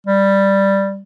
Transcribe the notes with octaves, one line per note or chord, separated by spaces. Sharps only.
G3